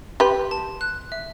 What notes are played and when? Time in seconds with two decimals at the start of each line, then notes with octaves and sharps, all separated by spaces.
0.20 G4 B4 C6
0.51 A5
0.81 F#6
1.12 E5